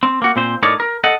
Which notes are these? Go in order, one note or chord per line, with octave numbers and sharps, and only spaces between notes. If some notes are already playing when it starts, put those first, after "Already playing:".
C4
A#3 F#4
A#2 C4 C5
A2 D#4 A#4 C#5 D5
A#4
A4 D#5 F#5